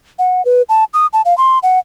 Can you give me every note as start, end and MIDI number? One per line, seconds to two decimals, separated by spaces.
0.19 0.44 78
0.45 0.62 71
0.69 0.84 81
0.94 1.07 87
1.13 1.22 81
1.25 1.37 77
1.38 1.59 84
1.63 1.79 78